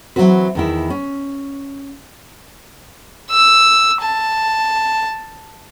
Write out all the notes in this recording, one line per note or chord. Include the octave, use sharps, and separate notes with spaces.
E3 F#3 A#3 C4 F#4 B4
E2 D#3 E4
C#4
E6
A5